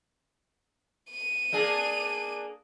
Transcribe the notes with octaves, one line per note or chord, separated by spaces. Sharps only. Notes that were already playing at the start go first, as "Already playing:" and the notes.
D#7
A#3 D4 G#4